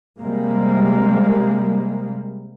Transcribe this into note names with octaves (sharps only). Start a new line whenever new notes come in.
C3 G3 G#3 A#3